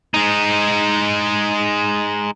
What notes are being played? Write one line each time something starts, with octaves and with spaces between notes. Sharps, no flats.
G#3 D#4